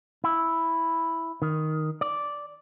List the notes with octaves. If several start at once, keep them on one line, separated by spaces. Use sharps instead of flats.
E4
D#3
D5